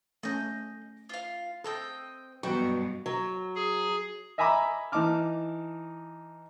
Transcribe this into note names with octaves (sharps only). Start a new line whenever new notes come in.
A3 C#4 D#5 G6
F4 F5
C4 A4 D#5 G5
G2 B2 F#3 B4 G5 C#6
F#3
G#4
D#5 E5 G#5 A#5 B5 D6
E3 D#4 A5 D6 F6